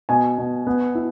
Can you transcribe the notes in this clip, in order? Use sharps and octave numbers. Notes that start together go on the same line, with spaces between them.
B2 G#5
B2
B3
E4